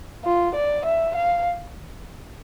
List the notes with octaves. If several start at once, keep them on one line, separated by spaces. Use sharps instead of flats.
F4
D5
E5
F5